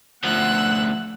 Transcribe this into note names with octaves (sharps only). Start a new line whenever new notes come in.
D2 F3 A3 F#5 E6 F#6